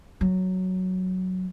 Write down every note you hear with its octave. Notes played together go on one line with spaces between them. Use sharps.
F#3